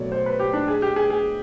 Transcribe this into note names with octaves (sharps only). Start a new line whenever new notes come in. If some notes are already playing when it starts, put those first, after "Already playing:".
Already playing: B2 F#3 A3 C#5 D5
C5
B4
G4
D4
G#4
G4
G#4
G#4